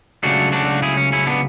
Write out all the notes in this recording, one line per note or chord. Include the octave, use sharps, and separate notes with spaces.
C#2 C#3 F#3 A3 D4 F#4
D4 F#4
E4 G#4
C#4
C#4 E4
B3 D4